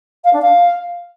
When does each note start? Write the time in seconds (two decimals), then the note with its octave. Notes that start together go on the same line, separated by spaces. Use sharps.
0.24 F5
0.33 D4
0.41 F5